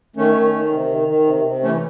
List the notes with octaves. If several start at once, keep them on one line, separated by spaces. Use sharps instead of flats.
D#3 A3 C#4
D#3
D#3
C3
D#3
D#3
C3
C3
E3 A3 C#4